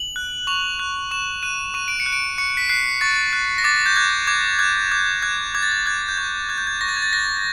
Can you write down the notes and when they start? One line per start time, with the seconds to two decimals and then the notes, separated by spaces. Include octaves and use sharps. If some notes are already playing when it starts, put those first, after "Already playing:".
Already playing: F#7
0.16 F#6
0.47 C#6 F7
0.79 F#6
1.11 C#6 E7
1.43 F#6 D#7
1.74 C#6 D#7
1.88 D7
2.00 C#7
2.06 F#6
2.12 D7
2.38 C#6 C#7
2.57 B6
2.69 F#6 C7
3.01 C#6 A6
3.33 F#6
3.58 A#6
3.64 D6 A6
3.86 G6
3.96 F#6 G#6
4.27 D6 G#6
4.59 F#6 G#6
4.92 D6 G6
5.23 F#6 G#6
5.55 D6 G#6
5.63 A6
5.72 G#6
5.86 F#6 G#6
6.09 G6
6.18 C#6 G#6
6.49 F#6 G#6
6.58 G6
6.67 G#6
6.81 C#6 A#6
6.89 A6
6.96 G#6
7.02 A6
7.13 F#6 A#6